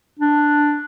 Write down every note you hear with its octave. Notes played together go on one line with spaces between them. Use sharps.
D4